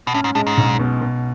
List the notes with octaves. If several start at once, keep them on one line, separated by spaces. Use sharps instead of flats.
B2
A2 C#4
G#2
A2 G#3
G#2
B1
B2
B2